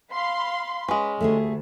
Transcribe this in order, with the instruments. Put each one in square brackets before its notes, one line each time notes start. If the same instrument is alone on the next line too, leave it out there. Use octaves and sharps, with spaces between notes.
[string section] F5 B5 C6
[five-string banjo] G#3 C#4 [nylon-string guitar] B4
[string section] D2 [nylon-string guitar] A3 G4 G#4